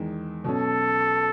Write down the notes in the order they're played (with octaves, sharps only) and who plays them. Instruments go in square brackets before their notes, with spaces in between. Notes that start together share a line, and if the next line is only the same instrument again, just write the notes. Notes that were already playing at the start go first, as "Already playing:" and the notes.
Already playing: [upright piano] E2 D#3 G#3
[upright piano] B2 F#3 C#4 [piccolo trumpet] A4